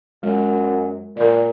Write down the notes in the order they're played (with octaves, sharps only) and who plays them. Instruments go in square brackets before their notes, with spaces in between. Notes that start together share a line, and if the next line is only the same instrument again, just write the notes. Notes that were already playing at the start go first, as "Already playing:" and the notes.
[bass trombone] F#2 [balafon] G#3
[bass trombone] A#2 [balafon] A#4 D5